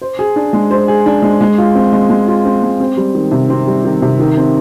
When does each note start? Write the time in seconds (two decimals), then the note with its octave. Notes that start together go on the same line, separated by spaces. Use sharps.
0.01 C5
0.19 G#4
0.36 D4
0.53 G#3
0.71 C5
0.88 G#4
1.06 D4
1.22 G#3
1.41 G#3
1.58 F4
1.75 C4
1.93 G#3
2.10 G#3
2.27 F4
2.45 C4
2.63 G#3
2.80 C4
2.97 G3
3.15 D#3
3.31 C3
3.50 C4
3.67 G3
3.85 D#3
4.02 C3
4.19 D#3
4.37 C4